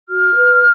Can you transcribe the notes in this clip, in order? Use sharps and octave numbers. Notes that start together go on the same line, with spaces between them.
F#4 F6
B4